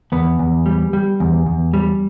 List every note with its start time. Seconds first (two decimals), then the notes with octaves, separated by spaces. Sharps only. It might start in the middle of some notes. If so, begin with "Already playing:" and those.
0.12 E2 B3
0.39 E2
0.66 G3
0.93 G3
1.20 E2
1.46 E2
1.74 G3